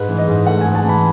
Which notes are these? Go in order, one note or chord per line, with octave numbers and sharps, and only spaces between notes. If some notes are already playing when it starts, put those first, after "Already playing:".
Already playing: G#2 B4
E3
D#5
G#2
A3 F#5
G#2 G#5
A5
E3 B5